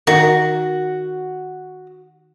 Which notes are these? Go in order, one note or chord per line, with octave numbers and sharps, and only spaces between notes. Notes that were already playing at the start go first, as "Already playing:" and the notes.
D#3 F#4